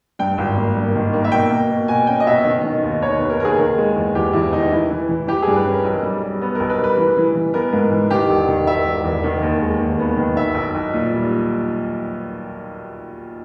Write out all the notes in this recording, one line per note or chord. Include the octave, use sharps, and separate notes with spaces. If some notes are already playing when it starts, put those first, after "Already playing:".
G2 G5
G#1
A#3
G2
D#3
A#3
E5
B2 G5
A#3
B2
B2 G#5
C#4 G5
D#5
B2 E5
D#3
D#3
D#2
D#2 C#5
B4
D#2
A#4
D#2 G#4 A#4
D#3
G#3
E2
E2 G4
E2 E4
D#3 D#4
E3 E4
E3
E3
E3 G4
G#4
G2
B4
C#4
A#4
B1
G3
G3
B3
A#4
B1
B4
G3
B4
E3
E3
E3
B3 A#4
G#2
E3
D#3 G4
E1
D#3
E1 E5
E1
E2
D#3
D#2
G#3
D#2
B3
D#3
B1 E5
B1
B1
A#2
G3